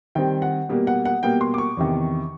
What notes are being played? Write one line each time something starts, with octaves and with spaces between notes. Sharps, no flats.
D#3 G3 C4 G5
F#5
B2 G3 A#3
F#5
F#5
B2 G3 A#3 G5
C6
D6
C#6
E2 C3 D#3